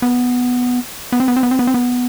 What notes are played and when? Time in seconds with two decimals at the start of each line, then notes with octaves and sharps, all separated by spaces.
0.02 B3
1.12 B3
1.20 C4
1.28 B3
1.36 C4
1.43 B3
1.51 C4
1.59 B3
1.67 C4
1.74 B3